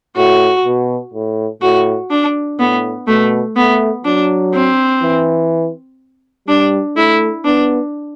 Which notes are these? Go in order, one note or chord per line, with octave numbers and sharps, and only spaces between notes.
A2 F#4
B2
A2
A2 F#4
D4
A2 B3
B2 A3
A3 B3
F#3 D4
C4
E3
G3 D4
A3 E4
B3 D4